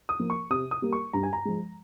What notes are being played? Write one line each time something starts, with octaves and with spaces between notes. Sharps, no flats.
D#6
F3 A#3
C#6
C3 D#6
D#6
G3 A#3
C#6
G2 A#5
G#5
A#5
F3 G#3